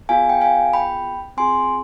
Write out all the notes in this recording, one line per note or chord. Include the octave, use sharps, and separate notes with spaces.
B3 F4 G#4 F5 G#5
G5
F5 G#5
G5 B5
C4 F4 G#4 G#5 C6